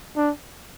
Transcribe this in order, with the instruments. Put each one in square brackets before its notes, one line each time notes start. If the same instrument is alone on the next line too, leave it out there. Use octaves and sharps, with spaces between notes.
[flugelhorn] D4